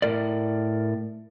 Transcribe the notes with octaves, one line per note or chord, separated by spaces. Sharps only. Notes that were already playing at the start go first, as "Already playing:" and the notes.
A2 A#4 D5